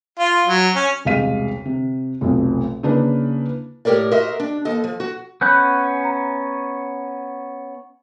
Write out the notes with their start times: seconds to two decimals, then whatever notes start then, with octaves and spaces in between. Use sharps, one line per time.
0.19 F4
0.46 F#3
0.75 C#4
1.05 E1 C2 G#3 F5 B6 D#7
1.65 C3
2.21 F1 B1 F2
2.83 C#3 A#3 D4 E4 B4
3.85 A2 G4 A#4 C#5 D5
4.11 F#4 A#4 C5 D#5 E5
4.40 D4
4.65 D#2 A4 D#5
4.84 F3
5.00 F#4
5.41 B3 C#4 B5 F#6 G6
6.04 A#5